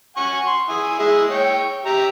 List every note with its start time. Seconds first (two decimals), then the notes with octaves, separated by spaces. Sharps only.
0.17 F#5 G#5 C#6
0.46 C6
0.69 E4 G#5 D#6
0.99 G#3 E4 G#4
1.30 C#5 G5
1.85 G4 E5 A#5